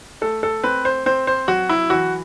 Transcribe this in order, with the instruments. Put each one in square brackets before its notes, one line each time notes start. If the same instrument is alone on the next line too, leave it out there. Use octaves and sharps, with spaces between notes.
[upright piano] A3 A4
A4
C4 B4
C5
C4 C5
C5
F#3 F#4
E4
E3 F#4